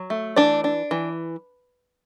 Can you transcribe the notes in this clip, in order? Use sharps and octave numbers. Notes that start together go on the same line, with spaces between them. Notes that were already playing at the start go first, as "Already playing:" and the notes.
Already playing: F#3
A3
E3 D4 D5
D4
E3